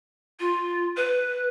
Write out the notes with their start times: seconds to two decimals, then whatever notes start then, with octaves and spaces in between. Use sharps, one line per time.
0.40 F4
0.97 B4